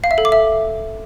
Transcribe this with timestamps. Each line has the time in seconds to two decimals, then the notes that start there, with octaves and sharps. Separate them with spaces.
0.04 F5
0.11 E5
0.18 A4
0.25 D6
0.32 E5